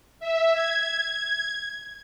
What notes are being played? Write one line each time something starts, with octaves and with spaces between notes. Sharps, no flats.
E5
G#6